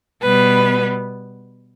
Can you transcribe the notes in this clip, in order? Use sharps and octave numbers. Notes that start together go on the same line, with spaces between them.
B2 G3 B3 B4